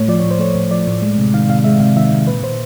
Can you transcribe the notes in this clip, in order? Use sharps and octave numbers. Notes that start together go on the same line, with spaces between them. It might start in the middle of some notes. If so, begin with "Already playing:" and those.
Already playing: A2 A3 C#5
F3 D5
A2 C#5
C5
A3 C#5
A2
F3 D5
A2
G#3
C3
D#3 F5
C3 F5
G#3 E5
C3 F5
D#3 E5
C3
A#2 B4
A#2 C5